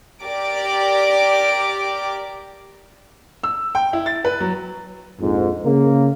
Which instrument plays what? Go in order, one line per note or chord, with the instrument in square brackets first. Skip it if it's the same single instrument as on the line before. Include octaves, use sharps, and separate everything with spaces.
[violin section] G4 A#4 D5 D6
[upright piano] E6
G5
E4
A6
B4
F#3
[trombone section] A#1 F2 G#2
C#3 A#3